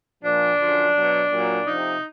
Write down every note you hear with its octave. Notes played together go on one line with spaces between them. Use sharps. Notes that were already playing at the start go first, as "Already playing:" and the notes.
A#2 F3 D4
F#2 D3 F3
B2 F#3
A#2 F#3
C3 F3 D#4